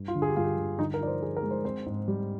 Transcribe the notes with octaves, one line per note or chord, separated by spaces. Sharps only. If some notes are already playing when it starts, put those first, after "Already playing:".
Already playing: G2
F4
D3
G#4
G4
G2 F4
G4
D3
D3 D#4
A#4
F3 D5
C5
F3 G#4
A#4
G#3
C5
C4 C5
G#2
G3